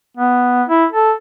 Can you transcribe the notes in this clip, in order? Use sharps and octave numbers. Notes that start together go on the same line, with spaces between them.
B3
E4
A4